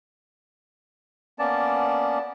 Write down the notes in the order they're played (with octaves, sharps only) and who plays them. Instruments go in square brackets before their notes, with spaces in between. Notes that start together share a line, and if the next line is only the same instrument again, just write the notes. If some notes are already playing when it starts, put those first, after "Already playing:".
[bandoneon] A#3 B3 C#4 D5 A5